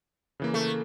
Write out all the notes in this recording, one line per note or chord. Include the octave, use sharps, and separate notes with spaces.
C#3 E3 A#3
A3